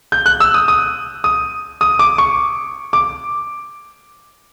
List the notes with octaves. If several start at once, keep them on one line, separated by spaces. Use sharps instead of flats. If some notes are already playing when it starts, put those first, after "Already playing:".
G6
F#6
E6
D#6
D#6
D#6
D#6
D6
C#6
D6